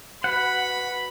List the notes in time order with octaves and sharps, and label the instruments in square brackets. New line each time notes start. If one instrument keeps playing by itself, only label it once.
[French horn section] F#4 B4 [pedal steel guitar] F#5 [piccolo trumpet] B5